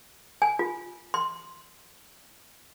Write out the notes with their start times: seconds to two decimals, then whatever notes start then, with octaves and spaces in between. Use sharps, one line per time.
0.42 G#5
0.59 F4
1.14 C6